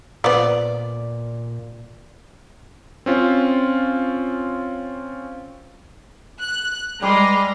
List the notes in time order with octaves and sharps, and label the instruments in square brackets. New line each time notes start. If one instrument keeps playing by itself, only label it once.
[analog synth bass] A#2 [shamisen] F3 B3 [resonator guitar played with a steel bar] D5
[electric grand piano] C4 C#4 F4
[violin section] F#6
[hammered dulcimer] G3 D6 [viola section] G#3 C6 [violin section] B4 A#5